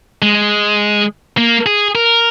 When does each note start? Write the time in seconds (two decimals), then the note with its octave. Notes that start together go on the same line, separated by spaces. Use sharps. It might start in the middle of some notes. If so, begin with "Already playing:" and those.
0.22 G#3
1.37 A#3
1.66 G#4
1.95 A#4